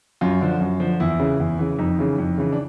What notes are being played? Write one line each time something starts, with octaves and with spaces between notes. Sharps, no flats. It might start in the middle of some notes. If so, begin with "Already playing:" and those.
F#2 F4
D3 F3
F#2
D3 F3
E2 E4
C#3 E3
E2
C#3 E3
F2 D#4
C#3 E3
F2
C#3 E3
D4